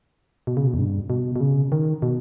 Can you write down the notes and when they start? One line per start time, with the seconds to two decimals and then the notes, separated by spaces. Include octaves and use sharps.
0.47 B2
0.57 C#3
0.67 B2
0.74 E2
0.79 G2
1.10 B2
1.36 B2
1.40 C#3
1.72 D#3
2.02 B2